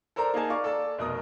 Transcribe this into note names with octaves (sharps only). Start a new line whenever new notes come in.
A4 A#4 C5 D5 A#5
A#3 D#4 G#4 A#4 G#5 A5
D5 F5 C#6 D6
A4 D5 A5
F1 B2 A#4 D#6